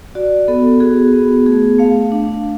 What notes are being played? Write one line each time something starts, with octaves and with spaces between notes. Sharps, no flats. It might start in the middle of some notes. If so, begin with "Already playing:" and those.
F#4 D5
B3 A4
F#4 G#4
B3
A3 G#4
A3 F5
D4 F5